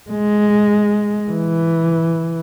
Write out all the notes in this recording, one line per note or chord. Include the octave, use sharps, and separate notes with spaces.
G#3
E3